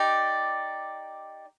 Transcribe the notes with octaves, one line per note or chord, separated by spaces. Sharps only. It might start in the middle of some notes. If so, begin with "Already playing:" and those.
Already playing: D#4 G4 D5